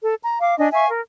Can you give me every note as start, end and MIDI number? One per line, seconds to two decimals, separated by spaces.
0.04 0.16 69
0.22 0.38 82
0.40 0.57 77
0.40 0.57 86
0.59 0.68 62
0.59 0.68 75
0.59 0.68 80
0.73 0.88 76
0.73 0.88 77
0.73 0.88 80
0.73 0.88 85
0.89 1.00 70